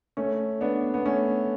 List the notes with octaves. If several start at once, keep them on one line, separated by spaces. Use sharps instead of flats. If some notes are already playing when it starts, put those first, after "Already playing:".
A3 C#4
B3 D4
B3
A3 C#4